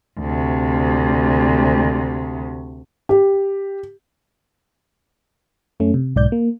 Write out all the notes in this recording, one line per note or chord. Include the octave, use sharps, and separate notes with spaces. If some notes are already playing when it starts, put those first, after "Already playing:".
D2 C3
G4
F#2 A3 C#4
C3
B1 G#2 D5 G6
A#3